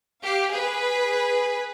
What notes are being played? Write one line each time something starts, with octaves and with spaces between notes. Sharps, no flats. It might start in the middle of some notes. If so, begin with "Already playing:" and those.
G4 F5
G#4 B4